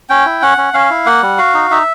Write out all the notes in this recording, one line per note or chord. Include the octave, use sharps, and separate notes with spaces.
C#4 G5
E4
C#4 F#5
C#4
C#4 F5
E4
A#3 F#5
G3
F#4 F5
D#4
D#4 E5